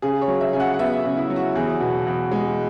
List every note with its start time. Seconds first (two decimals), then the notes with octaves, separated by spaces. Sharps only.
0.02 C#3 G#4
0.22 C#5
0.28 F#3
0.41 E5
0.53 C#3 G#5
0.60 F#5
0.74 F#5
0.79 B3 E5
1.04 C#3
1.17 E4
1.30 F#3
1.36 F#4
1.55 E2 G#4
1.80 B2
2.07 E2
2.31 G#3